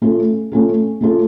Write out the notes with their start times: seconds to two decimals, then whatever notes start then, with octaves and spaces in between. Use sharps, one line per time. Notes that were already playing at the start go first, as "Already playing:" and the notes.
0.02 A3 C#4 F4 A4
0.52 A3 C#4 F4 A4
1.01 A3 C#4 F4 A4